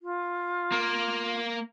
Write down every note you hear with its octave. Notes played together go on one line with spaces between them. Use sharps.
F4
A#3